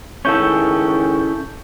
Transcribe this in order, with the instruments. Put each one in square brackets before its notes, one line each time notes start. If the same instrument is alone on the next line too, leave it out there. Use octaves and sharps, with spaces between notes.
[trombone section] C#2 D#3 G#4 [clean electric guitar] C#4 E4 A4 [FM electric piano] C#6 G6